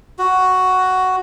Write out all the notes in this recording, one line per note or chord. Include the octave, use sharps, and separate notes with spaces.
F#4